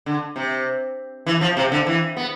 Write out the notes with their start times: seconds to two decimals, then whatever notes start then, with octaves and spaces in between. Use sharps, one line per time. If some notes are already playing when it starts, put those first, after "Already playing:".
0.06 D3
0.36 C3
1.26 E3
1.41 F3
1.57 C3
1.72 D3
1.87 E3
2.17 B3